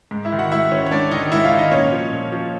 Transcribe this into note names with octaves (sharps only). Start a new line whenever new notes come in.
G#2
E4 E5
D#3
F#4 F#5
G#2 E4 E5
D#3 C#4 C#5
C#5
G#2 D4 D5
D#3 D#4 D#5
G#2 E4 E5
F4 F5
D#3
D#4 D#5
A#2 C#4 C#5
F3
A#2
F3